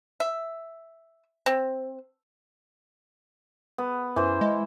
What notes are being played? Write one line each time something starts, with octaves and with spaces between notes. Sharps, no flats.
E5
C4
B3
F#2 E3 C5
G#3